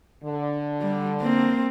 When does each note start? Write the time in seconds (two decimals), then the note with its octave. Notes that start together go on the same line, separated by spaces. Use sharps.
0.25 D3
0.81 G3
1.21 A#3 C4